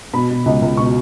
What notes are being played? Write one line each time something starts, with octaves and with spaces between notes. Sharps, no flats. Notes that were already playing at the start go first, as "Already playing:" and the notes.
B2 B5
B2
C#2
C#2
B2 C#6